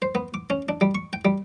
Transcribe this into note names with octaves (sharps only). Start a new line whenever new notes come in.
C5
B3
D6
C#4
D4
G3
C#6
G5
G3